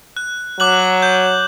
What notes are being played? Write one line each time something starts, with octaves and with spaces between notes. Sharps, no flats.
F#6
F#3 D6 F#6 F#7
G6